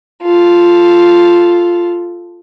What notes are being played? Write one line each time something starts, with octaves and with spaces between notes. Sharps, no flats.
F4 A4